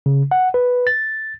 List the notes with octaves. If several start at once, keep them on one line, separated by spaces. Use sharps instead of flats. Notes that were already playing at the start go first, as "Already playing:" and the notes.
C#3
F#5
B4
A6